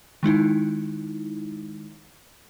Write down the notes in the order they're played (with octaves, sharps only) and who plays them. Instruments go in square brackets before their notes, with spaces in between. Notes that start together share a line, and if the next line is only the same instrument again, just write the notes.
[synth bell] D#3 G#3 D#4 E4